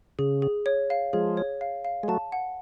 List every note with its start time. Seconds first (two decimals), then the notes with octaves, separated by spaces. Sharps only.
0.19 C#3 G#4
0.42 G#4
0.66 C#5
0.90 F5
1.13 F3 G#3 G#4
1.37 C#5
1.61 F5
1.85 F5
2.03 G#3
2.08 F#3 A3 A5
2.32 F#5